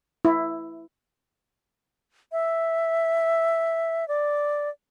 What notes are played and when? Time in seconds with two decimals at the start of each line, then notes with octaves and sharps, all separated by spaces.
0.25 E4
2.32 E5
4.08 D5